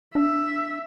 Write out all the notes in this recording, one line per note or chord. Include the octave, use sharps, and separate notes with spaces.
D4 E5